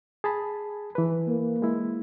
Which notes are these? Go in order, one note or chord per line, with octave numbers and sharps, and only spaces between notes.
G#4 A5 B5
E3 B4
A#3
G#3 E4